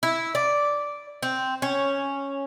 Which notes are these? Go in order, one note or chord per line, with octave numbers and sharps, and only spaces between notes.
E4
D5
C4
C#4